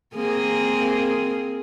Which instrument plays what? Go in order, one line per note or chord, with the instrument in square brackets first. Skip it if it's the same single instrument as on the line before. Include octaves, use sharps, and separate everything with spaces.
[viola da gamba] A#3 C4 G#4